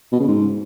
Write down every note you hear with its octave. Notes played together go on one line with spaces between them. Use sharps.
B2
C#3
G#2